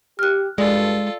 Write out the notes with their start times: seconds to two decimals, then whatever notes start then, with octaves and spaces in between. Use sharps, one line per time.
0.19 G4 F6 F#6
0.58 G2 G#3 F4 A4 D5